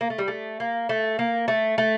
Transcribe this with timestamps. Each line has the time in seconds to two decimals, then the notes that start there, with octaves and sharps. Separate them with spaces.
0.01 A#3
0.10 A3
0.18 G3
0.28 A3
0.60 A#3
0.89 A3
1.19 A#3
1.48 A3
1.78 A3